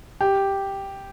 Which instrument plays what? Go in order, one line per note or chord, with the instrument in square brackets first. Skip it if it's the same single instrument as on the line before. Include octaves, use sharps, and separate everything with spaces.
[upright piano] G4